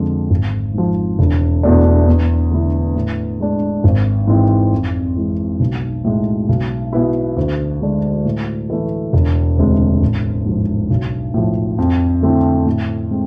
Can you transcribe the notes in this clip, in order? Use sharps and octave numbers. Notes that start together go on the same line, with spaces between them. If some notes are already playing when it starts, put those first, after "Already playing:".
Already playing: F2 D3 F3 G#3
G#1
G#2 F3
E1
E2 B2 A3 D4
E2
D3 A3 E4
A2
G#3 D4
G#1
G#2 E3 G#3 C4
F2
E3 G#3
B1
A2 G#3
B1
B2 B3 E4
D2
D3 G#3 D4
A2
E3 A3
E1
D2 C3 G#3
A1
G#2 F3
B1
A2 F3
F2
D3 A3 C4 E4
A2
G#3 C4